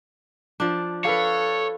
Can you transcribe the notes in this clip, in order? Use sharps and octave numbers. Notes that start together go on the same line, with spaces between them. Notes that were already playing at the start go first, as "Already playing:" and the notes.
F3 D4
A4 B4 C#5 F5